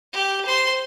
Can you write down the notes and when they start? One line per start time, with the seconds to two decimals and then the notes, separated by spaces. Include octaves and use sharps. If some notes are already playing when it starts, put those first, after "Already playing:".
0.13 G4
0.46 C5 C6